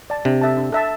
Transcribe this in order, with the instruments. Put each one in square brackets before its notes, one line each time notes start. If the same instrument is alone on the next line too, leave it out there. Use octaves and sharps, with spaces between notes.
[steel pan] D5 A5
[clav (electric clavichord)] C3 [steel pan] D4
[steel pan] A4 E5 A5
D4
A4 E5 A5